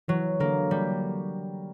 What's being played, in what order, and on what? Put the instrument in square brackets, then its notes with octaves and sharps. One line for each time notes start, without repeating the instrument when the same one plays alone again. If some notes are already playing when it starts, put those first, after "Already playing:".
[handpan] E3 [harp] F#3
[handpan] D3 [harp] A#3
[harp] G3